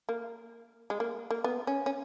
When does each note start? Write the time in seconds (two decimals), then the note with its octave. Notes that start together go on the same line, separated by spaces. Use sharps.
0.09 A#3
0.90 G#3
1.00 A#3
1.30 A#3
1.44 B3
1.67 C#4
1.86 C#4